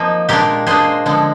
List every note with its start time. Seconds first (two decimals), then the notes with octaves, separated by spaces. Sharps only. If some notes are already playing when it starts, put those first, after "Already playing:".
Already playing: F3 A#3 C4 D#4
0.29 A#2 G#3 D4 G4 A#4
0.67 A#2 G#3 D4 G#4 C5
1.06 D3 F3 G#3